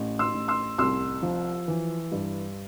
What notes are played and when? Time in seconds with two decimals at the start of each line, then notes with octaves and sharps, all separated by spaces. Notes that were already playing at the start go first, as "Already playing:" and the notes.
Already playing: A1
0.19 C6 E6
0.34 A1
0.48 C6 E6
0.78 C2 C6 E6
1.23 F3
1.68 E3
2.12 G2